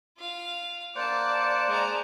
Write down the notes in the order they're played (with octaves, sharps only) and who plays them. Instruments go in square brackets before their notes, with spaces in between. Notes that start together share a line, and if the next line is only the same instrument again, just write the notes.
[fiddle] F4 F5
[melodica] A#3 C5 F#5 [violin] D5 A5 [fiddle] D6
[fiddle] G#3 A#5